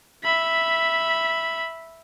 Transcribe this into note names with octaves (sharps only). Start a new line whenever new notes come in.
E5 B5